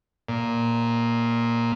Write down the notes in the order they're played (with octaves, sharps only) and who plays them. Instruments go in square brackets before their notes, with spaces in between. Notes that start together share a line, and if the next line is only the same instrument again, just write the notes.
[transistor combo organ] A#2